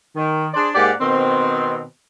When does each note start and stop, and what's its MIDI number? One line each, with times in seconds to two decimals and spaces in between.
0.16 0.47 51
0.54 0.69 62
0.54 0.69 68
0.54 0.69 72
0.54 0.69 74
0.75 0.91 44
0.75 0.91 58
0.75 0.91 67
0.75 0.91 74
0.75 0.91 78
1.01 1.83 47
1.01 1.83 51
1.01 1.83 60